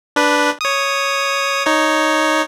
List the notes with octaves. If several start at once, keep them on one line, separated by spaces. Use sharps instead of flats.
D4 B4
C#5 D#6
D#4 C#5